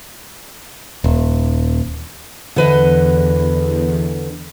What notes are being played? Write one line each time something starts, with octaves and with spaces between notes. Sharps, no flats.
D#1
E2 D3 B4 D#5